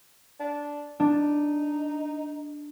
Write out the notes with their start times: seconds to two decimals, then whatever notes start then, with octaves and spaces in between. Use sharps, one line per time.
0.40 D4
1.00 D4 D#4